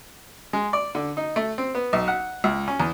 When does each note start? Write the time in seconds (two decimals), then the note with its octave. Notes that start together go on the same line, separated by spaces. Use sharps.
0.53 G#3
0.73 D5
0.95 D3
1.17 D#4
1.36 A3
1.58 C4
1.75 B3
1.93 B1
2.08 F#5
2.44 C#2
2.68 C#4
2.80 E2